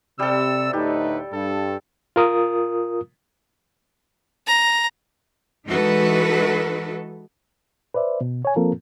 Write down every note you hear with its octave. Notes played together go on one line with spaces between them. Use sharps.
C3 G3 A4 E6
D2 A2 D#4 G4 B4
G2 A4
F4 A#4 D#6
A#5
E3 G#3 D#4 F#4 A4 B4
B4 C5 D5 E5
B2
C#5 G#5
F3 A#3 C4 F4 A4 A#4